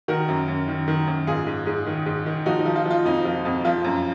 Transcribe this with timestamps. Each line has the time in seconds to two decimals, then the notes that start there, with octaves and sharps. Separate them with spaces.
0.08 D#3 F#4 A#4
0.28 F#2
0.48 F#2
0.68 D#3
0.88 D#3
1.08 F#2
1.27 G#2 F4 G#4
1.47 G#2
1.67 G#2
1.86 D#3
2.06 G#2
2.26 D#3
2.46 F3 D#4 F#4
2.60 D#4
2.66 F3
2.76 F4
2.86 F3 F4
3.05 F2 D#4
3.25 F3
3.45 F2
3.65 F3 F4
3.84 F#2